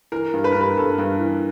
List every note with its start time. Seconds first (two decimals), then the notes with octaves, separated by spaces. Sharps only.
0.12 E3 A#4
0.34 G2
0.44 B4
0.52 G2 A#4
0.61 B4
0.77 G2 A4
0.98 G2
1.19 E3